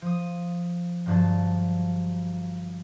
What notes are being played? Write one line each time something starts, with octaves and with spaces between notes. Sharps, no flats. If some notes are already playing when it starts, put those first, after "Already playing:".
F3 D#6
G1 G2 F3 F#3 A5